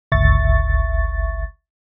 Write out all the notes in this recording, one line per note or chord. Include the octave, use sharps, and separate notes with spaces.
G1 C#2 E5 C#6 A6